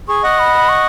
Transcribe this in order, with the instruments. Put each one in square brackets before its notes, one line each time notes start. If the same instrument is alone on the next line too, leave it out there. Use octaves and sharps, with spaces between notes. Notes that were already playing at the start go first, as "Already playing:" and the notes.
[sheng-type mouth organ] G#4 [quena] C#6
[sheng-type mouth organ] D#5 F#5
[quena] B5
C#6